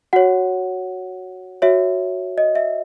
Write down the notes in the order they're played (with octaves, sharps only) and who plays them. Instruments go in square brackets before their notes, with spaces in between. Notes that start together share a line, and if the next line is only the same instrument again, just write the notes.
[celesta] F#4 C#5 F#5
F#4 C#5 E5
D#5
E5